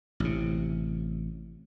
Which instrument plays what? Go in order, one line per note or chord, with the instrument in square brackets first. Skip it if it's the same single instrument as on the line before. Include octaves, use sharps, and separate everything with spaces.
[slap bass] A1 C3